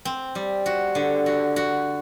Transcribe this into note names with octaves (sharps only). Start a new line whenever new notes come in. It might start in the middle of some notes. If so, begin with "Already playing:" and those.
C4
G3
F#4
D3
F#4
F#4